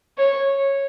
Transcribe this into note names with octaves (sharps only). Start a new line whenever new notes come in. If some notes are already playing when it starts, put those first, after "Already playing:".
C#5